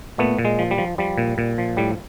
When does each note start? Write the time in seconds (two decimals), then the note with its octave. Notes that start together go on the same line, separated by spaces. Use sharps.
0.18 A#2 A3 B3
0.39 A#2
0.45 G#3
0.59 F3
0.71 G3
0.78 F3
0.98 F3 G3
1.18 A#2
1.38 A#2
1.58 F3
1.77 A2 G3